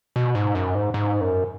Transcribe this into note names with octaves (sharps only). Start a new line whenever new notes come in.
B2
G#2
F#2
G#2
G#2
F#2